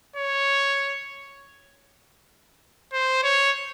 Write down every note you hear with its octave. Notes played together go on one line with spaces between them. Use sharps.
C#5
C5
C#5